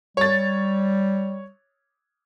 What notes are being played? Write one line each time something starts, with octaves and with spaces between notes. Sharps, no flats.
G3 C#5 A6